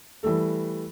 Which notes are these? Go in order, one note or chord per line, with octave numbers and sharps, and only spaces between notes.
E3 G3 A3 A4